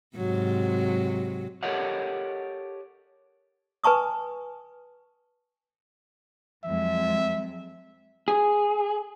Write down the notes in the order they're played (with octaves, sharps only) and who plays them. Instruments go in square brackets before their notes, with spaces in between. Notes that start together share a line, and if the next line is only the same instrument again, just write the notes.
[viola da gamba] G#2 C3 F#3
[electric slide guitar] G4 A4 A#4 C#5 D#5 F#5
[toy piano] B4 G#5 A5 C#6 D#6
[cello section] F2 F#3 G#3 [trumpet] E5
[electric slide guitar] G#4